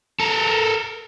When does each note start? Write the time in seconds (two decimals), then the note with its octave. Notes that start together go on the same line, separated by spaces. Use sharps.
0.20 A4 A#4